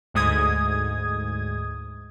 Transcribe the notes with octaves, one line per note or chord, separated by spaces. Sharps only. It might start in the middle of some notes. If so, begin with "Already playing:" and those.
D2 G#2 D#6 G#6